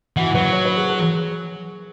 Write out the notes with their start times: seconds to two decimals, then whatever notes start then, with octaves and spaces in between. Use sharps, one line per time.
0.17 E3 F#4
0.35 F#3 B4
0.52 C#5
0.65 B4
0.77 G#4
0.89 G#4